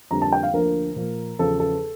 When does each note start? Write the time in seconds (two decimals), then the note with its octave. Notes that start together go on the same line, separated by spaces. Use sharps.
0.11 F2 D3 G3 A#3 A#5
0.22 A5
0.33 G5
0.43 F5
0.53 D2 D3 F3 A#3 A#4
0.96 A#2 F3 A#3
1.39 E2 C#3 F3 A4
1.60 A4